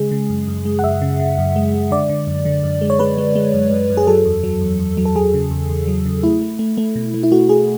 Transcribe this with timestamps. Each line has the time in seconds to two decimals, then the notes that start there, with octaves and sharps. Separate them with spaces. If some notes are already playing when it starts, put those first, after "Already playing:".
Already playing: C#3 G#3 G#4
0.11 C#3
0.30 F#2
0.48 F#2
0.65 G#3
0.79 F#5
0.84 F#2 E5
1.02 C#3
1.20 C#3
1.38 F#2
1.56 G#3
1.74 G#3
1.91 D3 D5
2.10 D3
2.27 F#2
2.45 D3
2.64 F#2
2.81 G#3
2.90 C#5
2.99 G#3 B4
3.18 G#3
3.35 G#3
3.54 F#2
3.71 F#2
3.90 F#2
3.97 G#4
4.07 F#3 A4
4.25 E2
4.43 F#3
4.61 E2
4.79 E2
4.97 F#3
5.05 A4
5.15 F#3 G#4
5.34 C#3
5.51 E2
5.69 E2
5.87 F#3
6.06 C#3
6.23 A3 E4
6.41 A3
6.59 A3
6.77 A3
6.95 B2
7.14 A3
7.23 E4
7.31 A3 F#4
7.49 A3 G#4